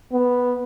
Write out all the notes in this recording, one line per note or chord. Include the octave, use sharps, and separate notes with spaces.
B3